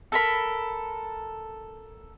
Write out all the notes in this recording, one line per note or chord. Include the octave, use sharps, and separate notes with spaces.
A4 A#4 B5